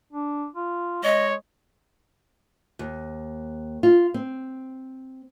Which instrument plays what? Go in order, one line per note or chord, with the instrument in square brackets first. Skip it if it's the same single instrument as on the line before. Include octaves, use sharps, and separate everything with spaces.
[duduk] D4
F4
[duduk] G#3 [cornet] C#5 [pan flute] D#5
[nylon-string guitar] D#2
F4
C4